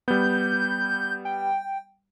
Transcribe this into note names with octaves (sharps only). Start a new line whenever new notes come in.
G3 B3 G6
G5